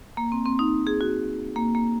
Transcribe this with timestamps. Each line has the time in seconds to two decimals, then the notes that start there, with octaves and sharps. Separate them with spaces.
0.17 A#3
0.32 C4
0.46 C4
0.59 D#4
0.87 G#4
1.01 F#4
1.56 A#3
1.75 A#3